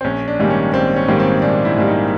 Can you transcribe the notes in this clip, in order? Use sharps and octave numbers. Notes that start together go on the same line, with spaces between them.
C4
A#1 C#4
D4
G#2 D#3 G3 A#3
C#4
A#1 C4
C#4
G#2 D#3 G3 A#3
C4
A#1 D4
E4
G#2 D#3 G3 A#3
D#4